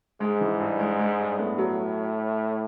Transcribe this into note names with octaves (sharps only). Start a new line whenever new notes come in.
G#2 G#3
E3
G2
G#3
G#3
G2
A2 B3
F#3